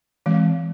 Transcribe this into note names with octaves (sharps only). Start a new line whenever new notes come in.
E3 G#3 C4